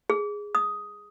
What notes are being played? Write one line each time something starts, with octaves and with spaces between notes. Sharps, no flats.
G#4
D#6